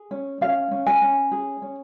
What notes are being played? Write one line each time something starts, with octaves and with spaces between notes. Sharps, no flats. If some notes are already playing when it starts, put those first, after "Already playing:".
Already playing: G#4
C#4
C#4 F5
C#4
G#5
C#4
G#4
C#4